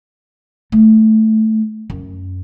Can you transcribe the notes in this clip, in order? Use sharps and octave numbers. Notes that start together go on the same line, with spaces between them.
A3
F#2